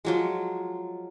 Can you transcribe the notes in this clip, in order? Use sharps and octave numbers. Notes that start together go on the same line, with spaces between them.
F3 F#3 G#3